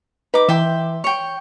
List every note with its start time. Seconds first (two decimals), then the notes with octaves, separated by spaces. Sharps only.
0.34 D#4 B4 D6
0.49 E3 E5 G5 C6
1.04 C#5 G5 C#6